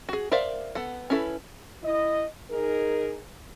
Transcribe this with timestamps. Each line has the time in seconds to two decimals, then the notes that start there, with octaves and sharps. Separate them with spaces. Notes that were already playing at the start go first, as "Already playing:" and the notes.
0.09 F#4 G#4
0.32 A#4 C5 D5 E5 F5
0.75 B3 A4 F#5
1.10 C#4 D4 E4 A4 B4
1.83 E4 D#5
2.48 D#4 G#4 A#4